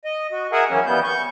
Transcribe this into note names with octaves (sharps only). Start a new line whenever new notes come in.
D#5
F#4
G#4 A#4 E5 F#5 G#5
D#3 E3 F#3 A#3 C#4
E3 G3 B3 G6
C#6 G6